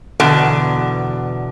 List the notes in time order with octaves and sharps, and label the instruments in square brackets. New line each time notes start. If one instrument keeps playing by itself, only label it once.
[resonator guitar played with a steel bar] E2 B2 D3